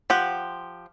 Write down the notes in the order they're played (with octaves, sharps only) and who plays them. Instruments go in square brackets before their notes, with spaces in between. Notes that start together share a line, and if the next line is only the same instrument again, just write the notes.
[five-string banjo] F3 G4 F#5